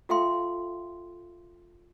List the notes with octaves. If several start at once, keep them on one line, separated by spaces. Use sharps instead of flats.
F4 A4 E5 F5 G5 C6